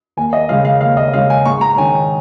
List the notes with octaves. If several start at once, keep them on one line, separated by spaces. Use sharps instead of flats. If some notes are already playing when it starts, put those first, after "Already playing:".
D#2 G#5
D#5
C#3 G#3 C#4 F5
F5
D#2 F5
D#5
C#3 G#3 C#4 F5
G#5
G#2 C#6
A#5
D#3 C#4 G#5